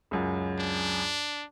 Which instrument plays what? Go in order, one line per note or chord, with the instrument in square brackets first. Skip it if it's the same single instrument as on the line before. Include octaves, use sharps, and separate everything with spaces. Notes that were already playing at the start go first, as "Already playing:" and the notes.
[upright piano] C#2 F#2
[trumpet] D4